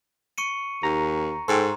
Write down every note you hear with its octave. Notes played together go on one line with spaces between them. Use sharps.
C#6 C#7 D#7
D#2 A#5
G#2 A4 G5 A#5 C6